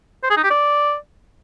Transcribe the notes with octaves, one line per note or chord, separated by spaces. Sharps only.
C5
G#4
D#4
G4
D5